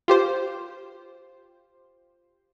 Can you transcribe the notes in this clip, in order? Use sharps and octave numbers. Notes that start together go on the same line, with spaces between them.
F4 G4 C5